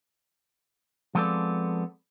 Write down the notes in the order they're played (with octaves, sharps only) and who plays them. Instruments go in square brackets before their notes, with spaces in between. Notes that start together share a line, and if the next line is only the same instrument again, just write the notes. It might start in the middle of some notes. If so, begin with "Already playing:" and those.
[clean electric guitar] F3 G#3 B3 C4 A4 D5